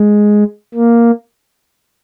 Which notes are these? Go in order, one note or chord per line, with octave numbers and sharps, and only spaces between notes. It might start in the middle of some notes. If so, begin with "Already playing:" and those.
Already playing: G#3
A#3